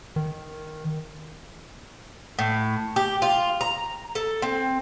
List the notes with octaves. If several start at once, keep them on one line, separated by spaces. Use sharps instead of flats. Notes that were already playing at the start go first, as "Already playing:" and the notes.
D#3
A2
G4
F4
A#5
A4
C4